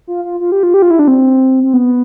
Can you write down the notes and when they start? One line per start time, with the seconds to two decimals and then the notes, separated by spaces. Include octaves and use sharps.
0.07 F4
0.25 F4
0.40 F4
0.52 G4
0.63 F4
0.74 G4
0.82 F4
0.91 E4
0.99 D4
1.08 C4
1.63 C4
1.74 B3